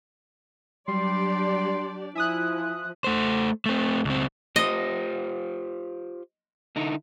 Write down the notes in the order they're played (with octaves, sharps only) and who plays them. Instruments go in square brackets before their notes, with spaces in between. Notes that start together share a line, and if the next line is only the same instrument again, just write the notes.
[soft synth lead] F#3 [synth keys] G3 [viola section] D4 G4 D5 [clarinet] C6
[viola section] F3 [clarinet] E4 [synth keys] E5 D#6 F#6 [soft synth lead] G#5
[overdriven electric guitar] A3 C5
A3 C4
C#2 C4
[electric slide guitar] F4 G4 C5 [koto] D#5
[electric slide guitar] D3 D#4 E4